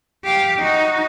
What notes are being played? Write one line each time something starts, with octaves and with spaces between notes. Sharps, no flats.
G4 F5
D#4 F#4